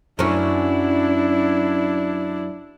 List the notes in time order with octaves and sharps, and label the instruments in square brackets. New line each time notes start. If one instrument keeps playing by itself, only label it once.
[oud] F#2 C#4 [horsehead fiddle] D4 E4